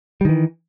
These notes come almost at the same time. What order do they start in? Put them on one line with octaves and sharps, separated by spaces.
G3 D#3 E3